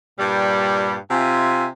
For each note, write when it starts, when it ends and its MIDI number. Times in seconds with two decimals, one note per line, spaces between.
0.19 0.96 43
0.19 0.96 46
0.19 0.96 55
1.10 1.67 48
1.10 1.67 65
1.10 1.67 76
1.10 1.67 80